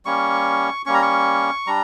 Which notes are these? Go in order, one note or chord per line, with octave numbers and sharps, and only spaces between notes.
G3 A#3 C#4 C#6
G3 A#3 C#4 C#6
A#5
C#6
G3 D4 A#5